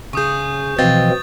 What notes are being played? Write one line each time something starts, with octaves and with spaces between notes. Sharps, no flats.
C#3 G#4 C#6 D#6 G6
B2 E3 F3 C4 D#5 F5 A6